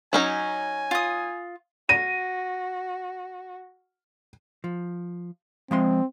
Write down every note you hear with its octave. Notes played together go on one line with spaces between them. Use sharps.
F#3 C#4 D#4 G#5
F4 D#6
F#4 A#6 D#7
F3
F3 G#3 C4 C6